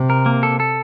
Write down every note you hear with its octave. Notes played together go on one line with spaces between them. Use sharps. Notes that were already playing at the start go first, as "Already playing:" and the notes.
Already playing: C3
A#4
A#3
A4
A4